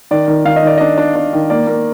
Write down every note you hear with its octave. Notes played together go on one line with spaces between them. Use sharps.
D#3 D5
D#3
D#3 F5
D#5
D#3 D5
D4 D#5
D4
D4
D#3
A#3 D5
A#3